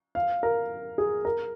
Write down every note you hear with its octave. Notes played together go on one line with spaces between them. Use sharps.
F5
A#4
G#4
A#4